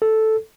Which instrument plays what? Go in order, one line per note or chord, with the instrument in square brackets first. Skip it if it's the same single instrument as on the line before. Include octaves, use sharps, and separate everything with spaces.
[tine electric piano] A4